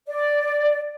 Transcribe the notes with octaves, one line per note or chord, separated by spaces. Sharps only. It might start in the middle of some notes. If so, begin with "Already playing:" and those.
D5